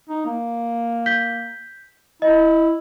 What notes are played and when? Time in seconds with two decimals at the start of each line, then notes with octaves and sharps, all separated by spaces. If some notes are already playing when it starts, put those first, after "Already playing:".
0.09 D#4
0.26 A#3
1.06 G6 B6 G7
2.22 E4 D#5